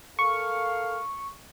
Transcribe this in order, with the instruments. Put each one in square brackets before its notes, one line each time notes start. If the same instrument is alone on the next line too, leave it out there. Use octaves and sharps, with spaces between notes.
[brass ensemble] A4 A#4 F5 [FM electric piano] C#6